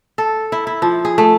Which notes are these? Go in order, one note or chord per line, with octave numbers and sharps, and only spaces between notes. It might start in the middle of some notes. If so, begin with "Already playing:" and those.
A4
E4
E4
F3
G#4
A3